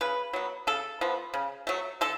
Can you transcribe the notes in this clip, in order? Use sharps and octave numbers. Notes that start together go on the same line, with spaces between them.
C#3 B4
F#3 B3
C#3 A4
F3 B3
C#3
F#3 A3
D3 A4